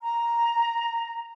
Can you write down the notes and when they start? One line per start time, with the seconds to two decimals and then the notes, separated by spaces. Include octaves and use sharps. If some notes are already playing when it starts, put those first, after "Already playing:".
0.01 A#5